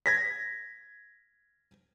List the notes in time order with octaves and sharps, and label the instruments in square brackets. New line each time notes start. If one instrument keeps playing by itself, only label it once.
[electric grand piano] G#6 A#6 B6